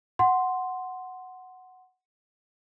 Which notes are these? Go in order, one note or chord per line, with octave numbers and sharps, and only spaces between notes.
F#5 C6